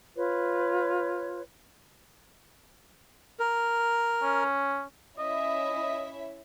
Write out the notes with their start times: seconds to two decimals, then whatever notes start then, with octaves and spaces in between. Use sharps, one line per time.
0.17 F4 B4 C#5
3.39 A#4
4.23 C#4
5.19 C#4 E4 D#5 E5